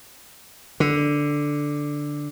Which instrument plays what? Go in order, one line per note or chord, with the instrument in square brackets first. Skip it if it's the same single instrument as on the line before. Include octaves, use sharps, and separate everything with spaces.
[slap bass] D3